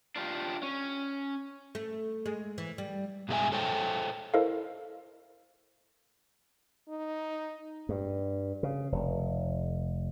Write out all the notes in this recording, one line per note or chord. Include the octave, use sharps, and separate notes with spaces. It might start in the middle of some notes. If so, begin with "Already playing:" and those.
D4 F4 G4
C#4
A3
G#3
E3
G3
G2 B2 G#3 D4 E5 G#5
A4 C5 C#5 G5
E4 A4 A#4 C5 D#5 F5
D#4
G2
C#3
F1